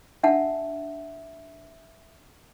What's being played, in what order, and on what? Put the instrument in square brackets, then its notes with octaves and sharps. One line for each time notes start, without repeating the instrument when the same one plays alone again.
[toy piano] D4 F#5 A5 [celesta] E5